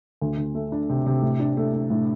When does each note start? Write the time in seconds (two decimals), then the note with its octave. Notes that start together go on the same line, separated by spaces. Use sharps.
0.22 D2
0.38 D2
0.55 A3
0.72 D4
0.89 C3
1.06 C3
1.22 A2
1.40 D4
1.57 A3
1.73 A3
1.90 A2